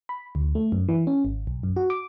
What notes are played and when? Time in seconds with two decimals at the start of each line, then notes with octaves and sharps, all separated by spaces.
0.09 B5
0.35 D2
0.55 A3
0.72 F#2
0.88 E3
1.07 C#4
1.25 G#1
1.47 B1
1.63 F#2
1.76 F#4
1.90 D6